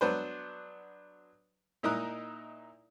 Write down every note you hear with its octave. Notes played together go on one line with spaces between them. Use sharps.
F#3 B3 D4 B4 C5
A#2 D#4 E4 A#4 D#6 F#6